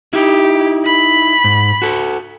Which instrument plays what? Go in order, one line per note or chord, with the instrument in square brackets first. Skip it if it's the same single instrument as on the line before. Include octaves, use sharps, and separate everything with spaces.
[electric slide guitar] D#4 E4 [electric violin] G4
[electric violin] B5
[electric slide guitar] G#2
F#4 A4